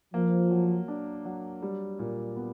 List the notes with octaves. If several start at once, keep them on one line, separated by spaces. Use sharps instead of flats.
F3 A#3
F#3
D4
F#3
G3
A#2
B3